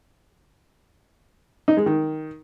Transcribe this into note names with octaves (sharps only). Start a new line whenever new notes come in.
D#4
G#3
D#3